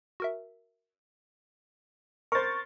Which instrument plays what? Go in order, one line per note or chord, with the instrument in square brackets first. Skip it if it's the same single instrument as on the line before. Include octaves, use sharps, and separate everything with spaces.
[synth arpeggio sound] F#4 A#4 E5
[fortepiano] A#4 C5 [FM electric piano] C#6 A6